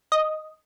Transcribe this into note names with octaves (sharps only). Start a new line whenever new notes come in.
D#5